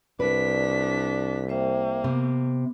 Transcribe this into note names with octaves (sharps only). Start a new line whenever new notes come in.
C2 D4 B4 D5 B6
A#3 C5 E5 G5
C3 B3